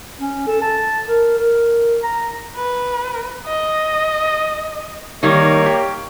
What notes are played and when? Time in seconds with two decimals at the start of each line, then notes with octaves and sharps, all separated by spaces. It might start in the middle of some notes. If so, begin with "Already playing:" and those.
0.20 C#4
0.47 A4
0.62 A5
1.09 A#4
1.38 A#4
2.03 A#5
2.56 B4
3.46 D#5
5.23 D#3 G3 A#3 D#4 C#5
5.66 G4